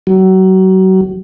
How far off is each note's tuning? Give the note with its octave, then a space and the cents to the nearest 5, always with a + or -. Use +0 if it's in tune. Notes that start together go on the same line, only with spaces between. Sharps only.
F#3 +30